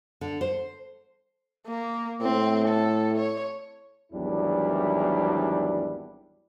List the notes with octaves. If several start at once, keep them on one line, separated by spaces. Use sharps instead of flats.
D3
C5
A#3
A2 C4
A4
C#5
G#1 E2 F#3 G3 D4 E4